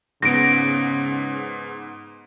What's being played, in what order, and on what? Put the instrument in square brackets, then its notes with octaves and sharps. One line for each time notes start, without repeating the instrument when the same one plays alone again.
[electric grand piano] G#2 B3 [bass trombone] C#3 [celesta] A#6 D7